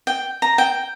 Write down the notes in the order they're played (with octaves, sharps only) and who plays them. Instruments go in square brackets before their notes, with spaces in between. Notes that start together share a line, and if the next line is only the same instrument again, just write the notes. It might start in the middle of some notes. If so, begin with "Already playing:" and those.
[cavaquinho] G5
A#5
G5